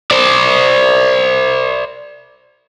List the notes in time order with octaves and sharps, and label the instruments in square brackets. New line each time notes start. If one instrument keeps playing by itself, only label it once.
[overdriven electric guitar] C5 D5